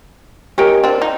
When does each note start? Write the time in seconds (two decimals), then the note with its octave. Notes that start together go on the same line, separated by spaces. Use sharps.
0.58 C#4 D#4 G4 A#4 D#5 G5
0.84 C4 D4
1.02 D#4